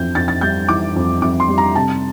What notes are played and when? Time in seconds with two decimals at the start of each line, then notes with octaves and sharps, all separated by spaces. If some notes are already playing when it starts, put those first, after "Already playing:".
Already playing: F2 E3 G6
0.15 F2 A6
0.28 A6
0.41 G3 G6
0.69 E3 D6
0.96 F2
1.22 F2 D6
1.40 C6
1.48 G3
1.58 A#5
1.75 C3 A5